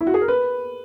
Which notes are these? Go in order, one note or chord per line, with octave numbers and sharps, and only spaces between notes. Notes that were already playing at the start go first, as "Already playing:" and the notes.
E4
F#4
G#4
A#4
B4